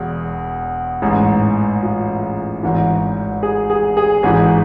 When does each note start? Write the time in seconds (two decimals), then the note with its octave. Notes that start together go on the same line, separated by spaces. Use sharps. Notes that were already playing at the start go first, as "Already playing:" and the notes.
Already playing: E1 E2
1.02 A1 G#2 E3
1.83 F4
2.63 G#1 G#2 E3
3.43 G#4
3.70 G#4
3.97 G#4
4.23 G#1 G#2 E3 G#4